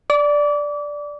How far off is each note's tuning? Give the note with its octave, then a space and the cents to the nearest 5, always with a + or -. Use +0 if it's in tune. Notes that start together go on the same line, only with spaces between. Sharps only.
D5 +0 D6 -30